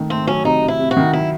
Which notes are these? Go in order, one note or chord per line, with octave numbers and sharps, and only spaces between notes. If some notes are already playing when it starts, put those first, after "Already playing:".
Already playing: D#3 A3
A3 C4
F#3 C#4
C3 D#4
C3
E4
C3
F#4
D#3
F#3 E4